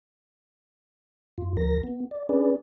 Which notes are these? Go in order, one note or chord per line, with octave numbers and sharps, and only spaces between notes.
F#2 F4
D2 F3 A#4 A#6
B3
D5
C#4 D4 G#4 B4 D5